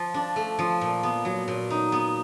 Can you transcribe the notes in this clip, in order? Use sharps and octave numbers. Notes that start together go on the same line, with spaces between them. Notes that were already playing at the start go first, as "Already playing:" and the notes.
Already playing: F3
D4
A3
F3
A#2
B3
F#3
A#2
D#4
B3